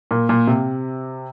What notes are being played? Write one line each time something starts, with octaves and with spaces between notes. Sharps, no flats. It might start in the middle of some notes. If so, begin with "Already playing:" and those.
A#2
A#2
C3